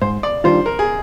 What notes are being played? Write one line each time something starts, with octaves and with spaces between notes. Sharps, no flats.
G#2 C5
D5
D#3 G3 D4 F4 C5
A#4
G#4